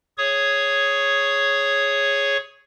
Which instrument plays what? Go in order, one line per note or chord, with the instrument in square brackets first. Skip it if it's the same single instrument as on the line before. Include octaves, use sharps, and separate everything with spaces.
[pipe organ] G#4 C#5 C#6 D#6